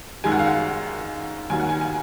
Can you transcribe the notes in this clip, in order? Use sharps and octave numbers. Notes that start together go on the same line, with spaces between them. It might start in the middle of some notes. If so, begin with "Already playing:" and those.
F#2 D#3 G#3 G#5
F#5
F5
F#5
D#2 D#3 F#3 G#5
F#5
G#5
G#5